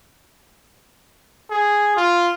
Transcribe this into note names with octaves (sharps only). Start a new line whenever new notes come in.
G#4
F4